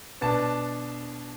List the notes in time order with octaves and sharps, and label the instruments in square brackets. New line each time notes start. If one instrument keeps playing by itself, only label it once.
[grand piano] B2 B3 D4 A5